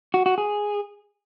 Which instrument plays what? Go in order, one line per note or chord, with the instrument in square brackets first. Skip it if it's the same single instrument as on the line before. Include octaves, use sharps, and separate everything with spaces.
[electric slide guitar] F#4
F#4
G#4